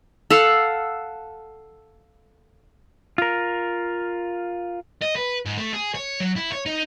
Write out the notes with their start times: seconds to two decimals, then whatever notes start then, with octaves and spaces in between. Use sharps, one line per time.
0.30 A4 F5 F#5
3.18 F4 A#4
5.02 D#5
5.16 B4
5.45 G#2
5.57 A3
5.73 G#4
5.94 C#5
6.20 F#3
6.36 E4
6.52 C#5
6.66 D#4